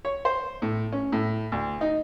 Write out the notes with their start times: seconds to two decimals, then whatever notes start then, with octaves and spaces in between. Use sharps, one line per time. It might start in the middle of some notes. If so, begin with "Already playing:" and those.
0.05 C#5
0.25 C5
0.62 A2
0.92 C#4
1.12 A2
1.52 D2
1.81 D#4